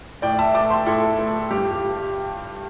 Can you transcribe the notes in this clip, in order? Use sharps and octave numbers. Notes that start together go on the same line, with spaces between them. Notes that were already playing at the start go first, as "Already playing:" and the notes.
A2 D5 G5
E5 A5
A3 A5 D6
G5 C6
A2 E4 A4
A3
G2 G4
G4